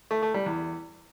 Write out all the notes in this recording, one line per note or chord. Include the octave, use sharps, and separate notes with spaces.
A3
A3
G3
E2